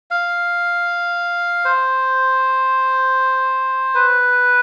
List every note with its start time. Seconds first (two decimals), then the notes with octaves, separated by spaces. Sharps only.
0.11 F5
1.65 C5
3.95 B4